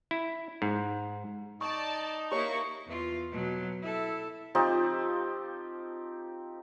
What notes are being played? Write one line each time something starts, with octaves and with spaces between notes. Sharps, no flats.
E4
G#2
D#4 D5 A5 C#6
A#3 E4 G4 C#5 C#6
E2 F4
B2 F#3
E4 A4
F3 C4 D#4 G4